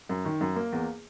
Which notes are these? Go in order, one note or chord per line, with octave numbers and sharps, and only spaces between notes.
F#2
D#3
F#2
A#3
E2